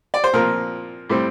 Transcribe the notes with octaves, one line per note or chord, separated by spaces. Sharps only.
D5
C5
A#2 F3 C4 A#4
A2 G3 C4